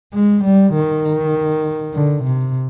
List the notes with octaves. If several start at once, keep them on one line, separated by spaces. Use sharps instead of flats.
G#3
G3
D#3
D3
C3